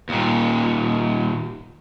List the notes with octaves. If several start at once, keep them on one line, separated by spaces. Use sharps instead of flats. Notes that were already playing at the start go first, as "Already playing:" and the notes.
D#2 A#2